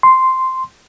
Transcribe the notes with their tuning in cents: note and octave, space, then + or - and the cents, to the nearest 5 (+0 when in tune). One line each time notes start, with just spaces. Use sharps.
C6 -5